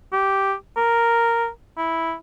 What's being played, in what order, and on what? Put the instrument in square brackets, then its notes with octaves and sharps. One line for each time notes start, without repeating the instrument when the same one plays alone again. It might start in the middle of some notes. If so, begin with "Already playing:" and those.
[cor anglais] G4
A#4
E4